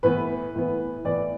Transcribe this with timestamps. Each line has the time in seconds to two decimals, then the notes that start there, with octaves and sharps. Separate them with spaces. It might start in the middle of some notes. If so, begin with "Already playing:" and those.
0.03 A2 E3 B3 B4
0.55 A2 E3 B3
1.05 A2 E3 B3 D5